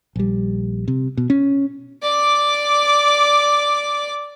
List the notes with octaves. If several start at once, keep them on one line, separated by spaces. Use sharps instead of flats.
A#1 G3
C3
B2
C#4
D5 D6